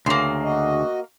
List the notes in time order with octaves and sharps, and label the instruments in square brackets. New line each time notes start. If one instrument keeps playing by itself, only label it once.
[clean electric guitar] D2 C#3 [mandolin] A#3 C6
[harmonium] F#4 D#5